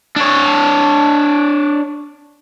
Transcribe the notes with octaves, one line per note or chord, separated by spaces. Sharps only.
D4 C#5